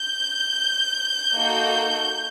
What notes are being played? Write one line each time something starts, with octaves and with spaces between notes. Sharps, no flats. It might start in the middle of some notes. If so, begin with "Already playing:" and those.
Already playing: G6
A#3 D#4 F#4 A4